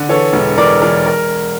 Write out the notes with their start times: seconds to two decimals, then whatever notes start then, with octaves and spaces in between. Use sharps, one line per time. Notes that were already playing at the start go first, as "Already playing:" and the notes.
Already playing: D3
0.09 E3 A4 C#5
0.33 E1
0.58 E3 A#4 D5
0.82 E3 A#4
1.06 A#4